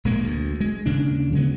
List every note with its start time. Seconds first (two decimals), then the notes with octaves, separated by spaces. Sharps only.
0.05 A#1 G#3 A#3
0.23 D2
0.61 G#3
0.86 D#2 C#3 D4
1.33 C#3 F#3 G#3 B3